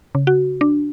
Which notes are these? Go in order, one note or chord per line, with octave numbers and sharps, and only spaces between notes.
C#3
F#4
D4